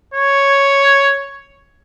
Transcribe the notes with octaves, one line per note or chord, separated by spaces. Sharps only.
C#5